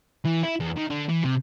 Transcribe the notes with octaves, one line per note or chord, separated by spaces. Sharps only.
E3
E4
E2
D#3
D3
E3
C3